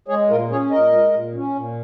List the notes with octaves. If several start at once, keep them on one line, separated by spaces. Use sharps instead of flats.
G#3 G#4 C#5
A#2 F4 A#4
C#4 G#4 C#5
A#2 A#4 D#5
G#3
A#2
C#4
A#2